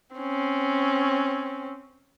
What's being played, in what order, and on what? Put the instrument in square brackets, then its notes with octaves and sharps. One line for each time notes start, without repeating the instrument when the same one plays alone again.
[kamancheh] C4 C#4